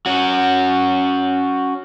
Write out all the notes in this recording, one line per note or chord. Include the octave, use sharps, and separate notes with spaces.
C#4 F#4